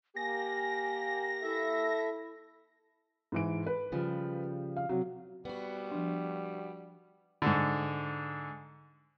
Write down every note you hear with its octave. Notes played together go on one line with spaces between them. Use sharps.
A#3 G4 G#5 A#6
E4 A4 E5
G#2 E3 D7
B4
C#3 F3 G3
F5
C3 F#3
G3 B3 F#4
F3 D4
G#2 D3